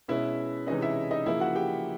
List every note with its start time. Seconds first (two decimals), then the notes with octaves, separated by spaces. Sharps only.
0.08 B2 G#3 C#4 E4 E5
0.67 C3 E3 G#3 C#4 D#4 D#5
0.81 E4 E5
1.11 D#4 D#5
1.26 C#3 F3 A#3 E4 E5
1.40 F#4 F#5
1.55 G4 G5